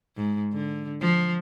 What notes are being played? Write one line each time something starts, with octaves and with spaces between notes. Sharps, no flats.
G#2
D3
F3